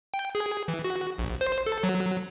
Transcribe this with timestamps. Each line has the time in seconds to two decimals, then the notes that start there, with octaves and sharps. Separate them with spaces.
0.14 G5
0.35 G#4
0.68 E3
0.84 F#4
1.18 A#1
1.41 C5
1.66 A4
1.84 F#3